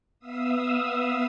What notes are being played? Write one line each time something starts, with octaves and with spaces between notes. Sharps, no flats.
B3 E5 F5 D#6 E6